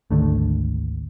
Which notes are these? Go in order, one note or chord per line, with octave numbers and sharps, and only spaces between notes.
G#1 D2 D3 A3